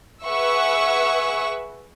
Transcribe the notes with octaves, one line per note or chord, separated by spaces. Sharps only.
G#4 B4 E5 F#5 C#6 E6